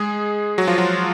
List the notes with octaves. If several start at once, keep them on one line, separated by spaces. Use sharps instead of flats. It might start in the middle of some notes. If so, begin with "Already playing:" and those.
Already playing: G#3 G#4
F#3 F#4
F3 F4
F#3 F#4